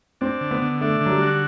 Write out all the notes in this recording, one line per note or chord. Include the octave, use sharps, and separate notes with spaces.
C4 D4
D3
B3
D3
A3 D4
D3
F#3
G3
F#4